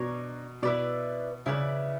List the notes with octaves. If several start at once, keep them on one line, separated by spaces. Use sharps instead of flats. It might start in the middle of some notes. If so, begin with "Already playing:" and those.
Already playing: B2 D4 A#4 C#5
B2 E4 B4 D5
C#3 E4 B4 D5